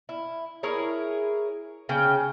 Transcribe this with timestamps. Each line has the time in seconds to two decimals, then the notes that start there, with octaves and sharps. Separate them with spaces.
0.09 E4
0.63 E4 G#4 A#4 C#5
1.89 C#3 C#4 G5